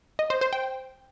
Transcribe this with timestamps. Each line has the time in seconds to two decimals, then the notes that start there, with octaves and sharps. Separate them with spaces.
0.19 D#5
0.30 C5
0.41 C5
0.53 G5